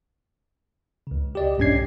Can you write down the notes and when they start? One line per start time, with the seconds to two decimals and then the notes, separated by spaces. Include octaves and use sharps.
1.07 C#2 C#3
1.35 G4 D5 D#5
1.58 B1 G2 C#4 D4 G#6 C7